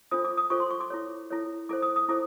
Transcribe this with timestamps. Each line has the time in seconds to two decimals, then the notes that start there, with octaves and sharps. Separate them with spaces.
0.11 D4 F4 A4 C5 D#6
0.24 D6
0.37 D#6
0.50 D4 F4 A4 C5 C#6
0.60 C6
0.70 C#6
0.81 D6
0.90 E4 A4 C#5
1.30 E4 A4 C#5
1.69 E4 A4 C5 D6
1.82 D#6
1.96 D#6
2.08 E4 A4 C5 D6